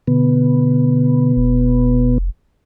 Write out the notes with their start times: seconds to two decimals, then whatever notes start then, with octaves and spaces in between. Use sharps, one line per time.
0.07 B2 D3 B3
1.37 F1